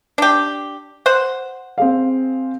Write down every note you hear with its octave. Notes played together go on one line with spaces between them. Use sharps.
D4 G4
C5 F#5
C4 G#4 F5